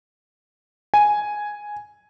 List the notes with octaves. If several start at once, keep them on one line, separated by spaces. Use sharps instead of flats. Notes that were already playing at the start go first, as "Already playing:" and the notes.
G#5